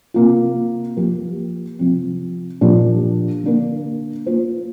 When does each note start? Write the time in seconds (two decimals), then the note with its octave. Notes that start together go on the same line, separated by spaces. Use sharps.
0.14 C3 A#3 F4
0.96 F3 A#3 G4 A#4
1.79 C3 F3 C4
2.61 A#2 F3 D4 G4
3.44 D3 A#3 D4 A#4
4.26 A#3 F4 C5